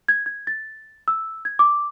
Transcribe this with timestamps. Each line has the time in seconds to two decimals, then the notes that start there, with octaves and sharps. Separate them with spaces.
0.08 G#6
0.26 G#6
0.47 A6
1.08 E6
1.45 G#6
1.59 D6